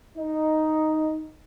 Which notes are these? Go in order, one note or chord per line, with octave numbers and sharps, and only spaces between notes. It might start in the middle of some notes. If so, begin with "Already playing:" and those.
D#4